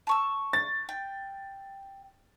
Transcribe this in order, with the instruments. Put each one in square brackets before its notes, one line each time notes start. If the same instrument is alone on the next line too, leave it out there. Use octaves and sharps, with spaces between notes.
[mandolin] A5 C#6 E6
[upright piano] A6
[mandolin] G5